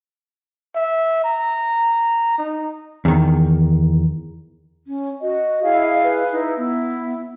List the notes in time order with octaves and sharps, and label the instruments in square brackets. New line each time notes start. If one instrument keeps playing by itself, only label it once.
[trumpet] E5
A#5
D#4
[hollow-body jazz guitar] E2 D#3
[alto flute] C#4
[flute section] F#4 [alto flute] D#5
[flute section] E4 G#4 F5
[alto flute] B4
[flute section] D#4 E4
[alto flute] B3 [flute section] E4